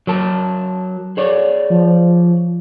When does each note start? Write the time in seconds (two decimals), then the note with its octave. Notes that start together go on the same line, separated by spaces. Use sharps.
0.07 F#3 A#4 A5
1.17 G#4 C#5 D5
1.70 F3